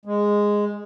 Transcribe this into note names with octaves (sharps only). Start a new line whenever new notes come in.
G#3